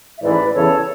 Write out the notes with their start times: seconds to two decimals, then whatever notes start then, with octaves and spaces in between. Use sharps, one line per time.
0.18 E5
0.22 A1 G#2 E3 B4 D5
0.54 E2 C#3 E3 A4 C#5